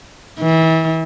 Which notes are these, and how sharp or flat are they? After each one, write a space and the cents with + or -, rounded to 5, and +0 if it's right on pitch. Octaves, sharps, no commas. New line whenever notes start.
E3 -30